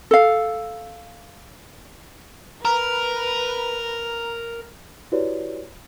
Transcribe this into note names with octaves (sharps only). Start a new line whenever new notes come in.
A4 F5
A#4 B4 A#5
E4 F#4 G4 B4 C#5 D5